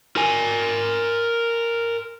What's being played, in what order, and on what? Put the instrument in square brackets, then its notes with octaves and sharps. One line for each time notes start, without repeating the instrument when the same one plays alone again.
[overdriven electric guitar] A#4 G#5